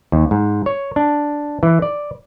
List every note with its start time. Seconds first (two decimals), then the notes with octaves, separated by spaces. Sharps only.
0.12 D#2
0.31 G#2
0.66 C#5
0.96 D4
1.63 E3
1.82 D5